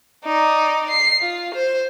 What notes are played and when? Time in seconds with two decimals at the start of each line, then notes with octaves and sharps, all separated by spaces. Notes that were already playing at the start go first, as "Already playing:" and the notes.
0.25 D#4 D5
0.90 C7
1.21 F4
1.54 C5